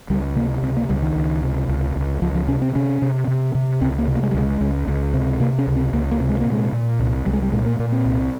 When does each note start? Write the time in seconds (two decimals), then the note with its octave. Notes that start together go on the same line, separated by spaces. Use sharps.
0.10 C#2 G3
0.36 C3 A#3
0.62 C#2 C4
0.77 A#3
0.89 C#2 G3
1.03 D#3
1.16 C#2
1.42 C3
1.69 C#2
1.96 C#2
2.22 C#2 F3
2.35 F3
2.48 C3 C#4
2.62 C4
2.75 C3 C#4
3.02 C3
3.27 C3
3.55 C3
3.81 C#2 C4
3.98 A#3
4.08 C3
4.16 A#3
4.23 G#3
4.31 G3
4.34 C#2 G#3
4.61 C#2
4.87 C#2
5.14 C3
5.40 C3 A#3
5.59 C#4
5.67 C#2
5.76 C4
5.93 C#2 A#3
6.11 A#3
6.20 C3
6.29 G#3
6.40 A#3
6.46 A#2
6.52 G#3
6.72 A#2
7.00 C2
7.26 C2 G3
7.33 G#3
7.42 G3
7.52 A#2 G#3
7.66 A#3
7.79 A#2 A#3
7.92 C4
8.05 C2